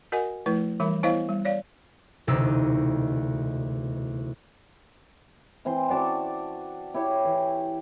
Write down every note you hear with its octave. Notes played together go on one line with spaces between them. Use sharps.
F#4 A#4 D#5 F#5 G#5
F3 A3 E4 B4
E3 G3 A#4 E5 B5
B3 E4 C5 C#5 D#5 F5
G3
C#5 D5 F5
E1 D2 C3 D#4 E6
E3 C4 C6
F#4 D5 A5 C#6
E4 G4 C#5 E5
E3